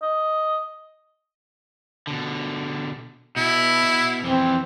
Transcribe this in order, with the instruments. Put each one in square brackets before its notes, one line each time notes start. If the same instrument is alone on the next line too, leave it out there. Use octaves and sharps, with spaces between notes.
[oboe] D#5
[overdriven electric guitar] B2 D3
[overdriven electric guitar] B2 B3 [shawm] E4
[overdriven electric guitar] F2 E3 [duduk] C4